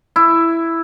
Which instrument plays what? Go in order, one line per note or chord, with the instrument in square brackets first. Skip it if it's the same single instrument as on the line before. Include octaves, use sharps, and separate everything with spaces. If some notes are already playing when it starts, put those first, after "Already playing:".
[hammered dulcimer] E4